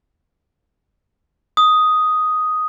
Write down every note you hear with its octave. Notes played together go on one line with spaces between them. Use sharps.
D#6